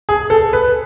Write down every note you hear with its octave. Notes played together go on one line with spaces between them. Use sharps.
G#4
A4
B4